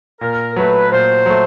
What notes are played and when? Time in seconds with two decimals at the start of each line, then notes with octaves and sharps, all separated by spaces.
0.21 A#2 A#4
0.56 F#3 A3 B4
0.91 A#2 C5
1.26 F#3 A3